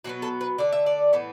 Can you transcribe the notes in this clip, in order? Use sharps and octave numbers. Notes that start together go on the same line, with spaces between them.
B2 F#3 B3 F#4
A4
B4
D3 A3 D5
E5
D5
A2 E3 B3